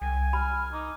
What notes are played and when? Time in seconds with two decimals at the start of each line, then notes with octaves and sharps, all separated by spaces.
0.02 C2 G5 G#5
0.33 B5 F6
0.72 D#4 D6